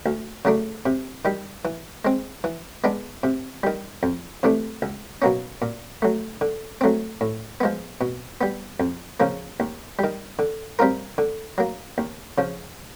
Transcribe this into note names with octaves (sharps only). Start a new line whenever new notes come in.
D2
C#3 F#3 A3 D4
C3
D#3 G3
E3
G#3 C4
E3
G#3 B3 D4
C3
D#3 G3
F2
C3 E3 A3 D4
C#2
B2 F#3 A#3 C#4
A#2
F#3 A3
D3
F#3 A3 C4
A2
F3 G#3 B3
B2
G3 B3
F2
C#3 F3 A#3
D#2
D#3 G3
D3
G3 C4 F4 A#4
D3
F#3 A#3
D#2
C#3 F3